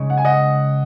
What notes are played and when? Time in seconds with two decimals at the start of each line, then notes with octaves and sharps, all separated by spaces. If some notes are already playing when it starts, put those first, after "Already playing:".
Already playing: C#3 G#3 C#4
0.10 F#5
0.17 G#5
0.25 D#5 F#5